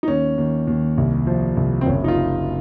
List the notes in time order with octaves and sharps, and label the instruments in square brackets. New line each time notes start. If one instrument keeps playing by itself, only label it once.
[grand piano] D#4
D#2 C#4
D#2
D#2
C2
F3
C2
C4
F#1 C#4
D#4
F4